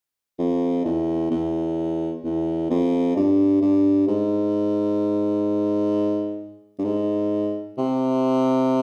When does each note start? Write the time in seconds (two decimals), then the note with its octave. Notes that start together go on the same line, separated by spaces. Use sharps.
0.39 F2
0.85 E2
1.31 E2
2.24 E2
2.70 F2
3.16 G2
3.62 G2
4.08 G#2
6.79 G2
6.85 G#2
7.78 C3